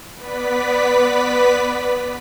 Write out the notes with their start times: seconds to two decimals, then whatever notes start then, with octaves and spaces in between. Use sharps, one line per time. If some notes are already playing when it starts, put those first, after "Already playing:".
0.15 B3 B4 D5 B6